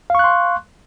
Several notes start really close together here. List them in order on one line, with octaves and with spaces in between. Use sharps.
F5 C#6 F#6 C6